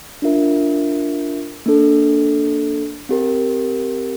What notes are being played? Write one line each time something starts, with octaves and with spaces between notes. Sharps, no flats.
D4 F4 A#4 E5
A#3 D4 A4
C4 G4 A#4